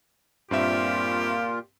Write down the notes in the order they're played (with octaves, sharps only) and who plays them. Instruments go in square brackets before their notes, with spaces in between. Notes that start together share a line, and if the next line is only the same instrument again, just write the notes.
[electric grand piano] G2 C4 E5 [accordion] A#2 F4 [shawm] G4